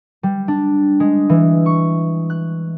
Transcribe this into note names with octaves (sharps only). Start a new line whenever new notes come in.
G3
D4
G#3
E3
C#6
F#6